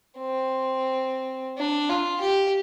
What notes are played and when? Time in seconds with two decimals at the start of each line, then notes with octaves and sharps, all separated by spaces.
0.19 C4
1.58 D4
1.89 F4
2.21 G4